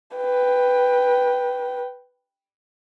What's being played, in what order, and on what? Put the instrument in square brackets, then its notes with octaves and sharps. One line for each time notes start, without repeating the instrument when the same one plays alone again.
[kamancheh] B4 G5